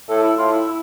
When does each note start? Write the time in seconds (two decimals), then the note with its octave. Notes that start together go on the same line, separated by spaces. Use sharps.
0.09 A2 A4
0.23 E4
0.37 A2 F4
0.52 E4
0.67 E4